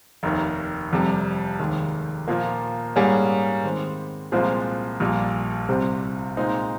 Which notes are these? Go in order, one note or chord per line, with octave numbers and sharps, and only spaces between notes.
F1 D#2 D#3
F1 F2 C3 G3
F1 D#2 D#3 G#3
A#2 F3 A#3
G#2 G3 A#3 C#4 G#4
D#3 G#3 C4
C2 A#2 F3 G#3 C4
A#1 A#2 G3
C2 C3 G3 C4
A#2 G#3 C4 D#4